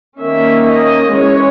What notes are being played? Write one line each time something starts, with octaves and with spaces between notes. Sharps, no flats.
D#3 A#3 C#4 E5
D#5
E3 G#3 C#4 C#5